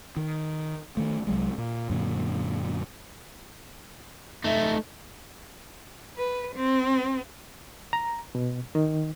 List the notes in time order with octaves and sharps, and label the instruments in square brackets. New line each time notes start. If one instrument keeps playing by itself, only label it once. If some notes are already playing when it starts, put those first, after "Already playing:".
[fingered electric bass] D#3
D#3 A3
C2 F#3 G#3
A#2
F#2 A#2 D3
[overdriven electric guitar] A3 D#4 [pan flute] E5
[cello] B4
C4
[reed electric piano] A#5
B2
D#3